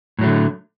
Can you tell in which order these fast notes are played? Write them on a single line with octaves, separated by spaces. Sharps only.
A2 F#3 A3 D3